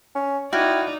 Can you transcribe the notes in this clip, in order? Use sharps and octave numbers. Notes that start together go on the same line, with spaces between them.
C#4
D#4 E4 F#4 D5 G5 F6 G#6